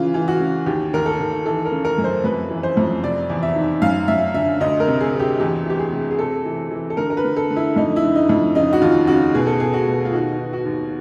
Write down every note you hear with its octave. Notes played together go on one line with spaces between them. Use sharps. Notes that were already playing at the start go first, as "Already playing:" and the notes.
Already playing: C#3 E3 F4
E3
F#4
C#3
D#2 G4
D#2 A#4
A4
D#2
E3 A4
A#4
C#3
A#4
F#2
C5
F2 B4
E3
C5
F2
C3 D5
E2
E5
D#3
F#2 F5
F#2 E5
D3 E5
D2 D#5
A#4
C3
G#4
D2
G4
E2 G4
E3 G4
G#4
C3
G#4
C3 A4
E3
E3
A4
D3 A#4
A#4
B4
D3
A4
D3
E4
F2 D#4
E4
D3
D#4
F2
C#3 D#4
F#4
D#2 F4
C#3 F#4
B2 G#4
A4
B2 G#4
F#4
B2
F4
D#3 F#4
D#3
F#4
D#2